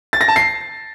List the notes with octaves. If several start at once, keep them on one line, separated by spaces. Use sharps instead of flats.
A6
A#6
A5
C7